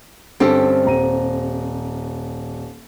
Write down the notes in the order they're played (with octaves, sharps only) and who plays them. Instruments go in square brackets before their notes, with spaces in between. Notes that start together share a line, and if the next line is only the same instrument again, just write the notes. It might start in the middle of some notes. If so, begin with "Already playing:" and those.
[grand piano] G2 D3 C#4 [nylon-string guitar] C4 G4 A4
[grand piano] D#1 A#5 D#7